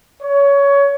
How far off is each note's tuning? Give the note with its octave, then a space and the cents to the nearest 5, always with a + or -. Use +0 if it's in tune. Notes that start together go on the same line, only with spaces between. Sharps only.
C#5 +20